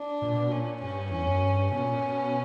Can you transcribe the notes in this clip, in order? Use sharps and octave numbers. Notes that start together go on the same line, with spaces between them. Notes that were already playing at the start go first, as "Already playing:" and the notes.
Already playing: D4
A#2
B2
A#2 C#4
G2 C#4
E2 C#4
F#2
G2
B2 C#4
A#2
A#2
B2